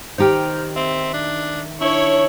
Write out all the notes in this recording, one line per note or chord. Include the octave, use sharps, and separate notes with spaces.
D#3 D#4 G4 C5 A#5 F6
C4 E5
D4
D4 E4 C#5 C#6